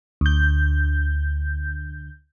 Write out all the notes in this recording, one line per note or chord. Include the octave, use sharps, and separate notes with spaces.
D2 G6